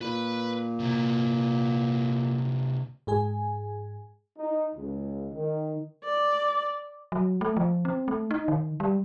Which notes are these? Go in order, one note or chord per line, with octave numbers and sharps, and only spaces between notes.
A#2 B4 B5
C3 A#3
G#2 G#4 G#5
D#4
C#2
D#3
D5
F#3
A3
F3
C4
A3
D#4
D#3
G3